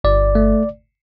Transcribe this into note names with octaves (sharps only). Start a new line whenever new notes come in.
G1 D5
A3